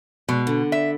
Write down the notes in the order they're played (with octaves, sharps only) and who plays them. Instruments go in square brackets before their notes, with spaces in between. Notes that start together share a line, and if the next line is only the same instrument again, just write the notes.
[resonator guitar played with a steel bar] B2 [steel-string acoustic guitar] G#3
[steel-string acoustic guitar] D3
[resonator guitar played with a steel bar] E5